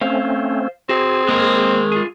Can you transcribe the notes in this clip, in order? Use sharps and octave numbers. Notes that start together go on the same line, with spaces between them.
A3 C4 C#4 C5 F5
C4 F#4 G#4
G#3 A#3 A#4
F4 G#4